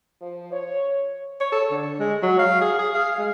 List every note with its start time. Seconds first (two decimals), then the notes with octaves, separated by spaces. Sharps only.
0.21 F3
0.52 C#5
1.41 C#5
1.52 A4
1.71 D3
1.99 G#3
2.22 F#3
2.39 F5
2.61 G#4
2.79 G#4
2.94 F5
3.18 G#3